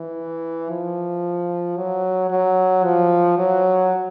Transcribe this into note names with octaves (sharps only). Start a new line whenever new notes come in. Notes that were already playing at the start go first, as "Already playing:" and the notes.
Already playing: E3
F3
F#3
F#3
F3
F#3